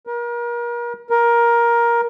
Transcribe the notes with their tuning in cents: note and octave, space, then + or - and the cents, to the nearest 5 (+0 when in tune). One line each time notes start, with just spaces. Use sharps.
A#4 +35
A#4 +15